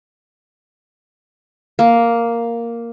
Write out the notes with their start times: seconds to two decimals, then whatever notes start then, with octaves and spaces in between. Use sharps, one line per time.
1.79 A#3